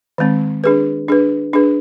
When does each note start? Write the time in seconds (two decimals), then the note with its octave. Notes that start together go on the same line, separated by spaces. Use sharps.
0.18 D#3 G#3 C4
0.64 D4 G#4 B4
1.09 D4 G#4 B4
1.54 D4 G#4 B4